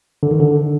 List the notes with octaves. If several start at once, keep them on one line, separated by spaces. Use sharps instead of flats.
D3
D#3
D3